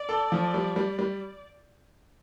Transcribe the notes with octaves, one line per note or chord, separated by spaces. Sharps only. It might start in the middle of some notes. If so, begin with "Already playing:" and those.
Already playing: D5
A4
F3
G3
G3
G3